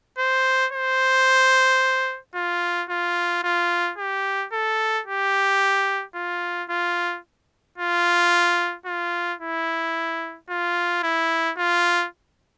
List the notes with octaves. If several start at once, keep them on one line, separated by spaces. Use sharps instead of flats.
C5
C5
F4
F4
F4
G4
A4
G4
F4
F4
F4
F4
E4
F4
E4
F4